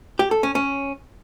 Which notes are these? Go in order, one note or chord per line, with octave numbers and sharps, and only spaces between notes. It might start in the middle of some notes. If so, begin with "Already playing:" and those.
G4
A4
C#4
C#4